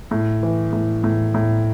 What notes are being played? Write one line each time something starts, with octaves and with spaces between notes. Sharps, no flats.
A2
E3
A2
A2
A2